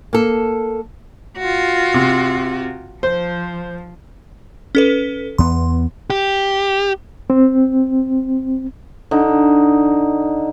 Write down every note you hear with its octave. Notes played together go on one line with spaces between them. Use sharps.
A#3 A4
F4 F#4
C3
F3 C5
C#4 A4 B4
E2 B3 C6
G4
C4
D3 D#4